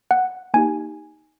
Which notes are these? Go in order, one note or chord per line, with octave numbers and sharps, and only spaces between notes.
F#5
A#3 D#4 G4 G#5